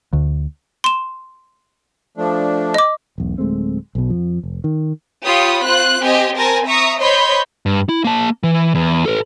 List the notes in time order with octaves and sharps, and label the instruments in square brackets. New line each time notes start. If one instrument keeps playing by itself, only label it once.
[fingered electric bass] D2
[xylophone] C6 E7
[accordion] F3 A3 D4
[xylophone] D#5 D6
[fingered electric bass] E1 B1
D1 G#3 A3 C4
B1 B2
F2 F3
F1
D#3
[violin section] F4 G4 C#5 B5 D#6
C4 F4 C5 F#6
C4 G4 C5 D#5 G#5
C4 A#4 G#5 A5 A#6
E5 A#5 C#6 D#6
C5 C#5 D#5 B5 C6 G6
[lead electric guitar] G2
E4
A#3 A5
E3
E2
A4 B4